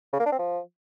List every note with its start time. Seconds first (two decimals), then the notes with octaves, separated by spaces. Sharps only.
0.13 C#3
0.19 A#3
0.26 D4
0.32 C4
0.38 F3